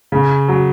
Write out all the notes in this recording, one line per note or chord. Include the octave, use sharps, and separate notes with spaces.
C#3
F#3